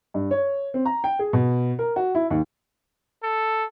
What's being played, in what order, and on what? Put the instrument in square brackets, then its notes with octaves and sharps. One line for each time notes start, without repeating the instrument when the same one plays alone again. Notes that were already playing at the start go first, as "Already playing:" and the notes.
[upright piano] G2
C#5
C4
A#5
G5
G#4
B2
A#4
F#4
E4
D#2
[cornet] A4